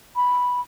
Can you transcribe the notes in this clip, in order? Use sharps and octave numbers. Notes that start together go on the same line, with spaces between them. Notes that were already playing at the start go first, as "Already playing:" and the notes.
B5